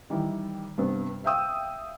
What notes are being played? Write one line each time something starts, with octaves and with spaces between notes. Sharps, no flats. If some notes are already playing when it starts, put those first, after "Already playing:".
D#3 E3 G3 E4
G2 C3 B3
E5 F5 G5 D#6 E6